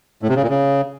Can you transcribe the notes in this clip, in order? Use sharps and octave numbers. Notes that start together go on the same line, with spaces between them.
A2
C3
C#3
A#2
C#3